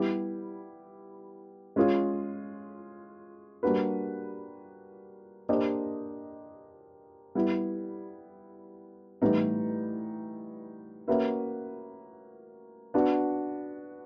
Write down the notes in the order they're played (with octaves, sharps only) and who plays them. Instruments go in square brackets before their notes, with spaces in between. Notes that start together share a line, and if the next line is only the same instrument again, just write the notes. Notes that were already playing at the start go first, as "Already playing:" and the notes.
Already playing: [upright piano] G3 B3 E4 G4
G#3 C#4 F4 G#4
G3 A#3 D4 F#4 B4
A#3 D4 G4 C5 D#5
G3 B3 E4
A2 E3 G3 B3 D#4
A#3 C#4 F#4 B4 E5
B3 D4 F#4